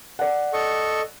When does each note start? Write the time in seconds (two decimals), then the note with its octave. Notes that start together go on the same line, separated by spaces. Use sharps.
0.19 D5 F#5
0.53 A4 D#5 C#6